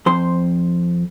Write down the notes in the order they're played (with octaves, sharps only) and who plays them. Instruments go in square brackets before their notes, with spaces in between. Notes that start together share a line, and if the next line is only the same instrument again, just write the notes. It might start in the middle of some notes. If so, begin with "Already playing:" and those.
[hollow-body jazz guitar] F2 C5 C6